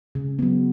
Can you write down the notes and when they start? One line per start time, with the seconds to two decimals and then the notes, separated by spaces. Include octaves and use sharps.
0.15 C#3
0.39 F#3 B3